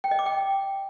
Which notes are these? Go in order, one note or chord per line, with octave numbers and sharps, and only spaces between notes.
G5
D#5
D6
G5